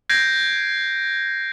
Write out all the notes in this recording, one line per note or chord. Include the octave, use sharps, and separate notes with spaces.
G6 G#6 A#6 C7 D7